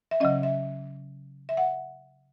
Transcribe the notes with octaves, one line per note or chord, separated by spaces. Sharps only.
E5
C#3 F#3 C#4 D#5
E5
E5
F#5